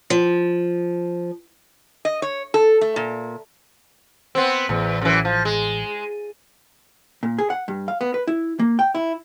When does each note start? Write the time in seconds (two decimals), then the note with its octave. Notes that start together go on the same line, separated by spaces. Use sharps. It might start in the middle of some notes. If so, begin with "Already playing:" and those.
0.10 F3
2.05 D#5
2.22 C#5
2.54 A4
2.81 A3
2.96 A#2
4.35 B3 C4
4.69 A1 E2
5.02 F#2 E3
5.25 F3
5.45 G#3
7.23 A#2
7.39 G#4
7.50 F#5
7.68 G2
7.88 F5
8.01 B3
8.14 B4
8.27 E4
8.59 A#3
8.79 G5
8.95 E4